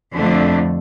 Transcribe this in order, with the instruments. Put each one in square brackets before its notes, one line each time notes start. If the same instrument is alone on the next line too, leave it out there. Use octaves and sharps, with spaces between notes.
[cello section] F2 D3 A3 D4